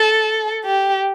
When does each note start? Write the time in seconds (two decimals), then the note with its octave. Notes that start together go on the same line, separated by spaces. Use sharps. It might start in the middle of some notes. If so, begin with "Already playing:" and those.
Already playing: A4
0.65 G4